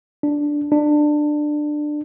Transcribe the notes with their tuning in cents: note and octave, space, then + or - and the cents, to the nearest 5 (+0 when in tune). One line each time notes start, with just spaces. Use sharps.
D4 +0
D4 +20